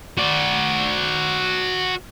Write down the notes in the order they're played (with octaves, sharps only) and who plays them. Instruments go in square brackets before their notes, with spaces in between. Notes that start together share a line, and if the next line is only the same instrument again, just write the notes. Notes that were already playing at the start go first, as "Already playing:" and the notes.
[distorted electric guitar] F#4 D5